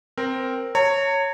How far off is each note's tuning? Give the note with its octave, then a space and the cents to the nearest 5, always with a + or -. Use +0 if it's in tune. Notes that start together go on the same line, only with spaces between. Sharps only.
C4 +0 A#4 +0
C#5 +0 A#5 -40